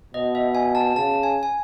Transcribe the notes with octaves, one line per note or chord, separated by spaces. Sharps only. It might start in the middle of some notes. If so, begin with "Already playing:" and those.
B2 D#5
E5
G#5
A5
C#3 A5
G#5
G#5